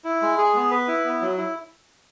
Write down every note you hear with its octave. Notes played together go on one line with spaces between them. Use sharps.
E4
G#3
G#4
B3
B4
E4
B3
F#3
E4